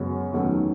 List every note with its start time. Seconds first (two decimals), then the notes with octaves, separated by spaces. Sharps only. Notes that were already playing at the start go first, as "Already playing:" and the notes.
Already playing: F#2 C#3 G#3 B3 F#4
0.33 E2 D#3 F#3 A3 C#4